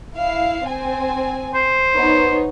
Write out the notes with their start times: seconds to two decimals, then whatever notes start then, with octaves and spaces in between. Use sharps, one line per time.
0.16 E4 F5
0.66 C4 G#5
1.54 C5
1.96 B3 D#4 C#5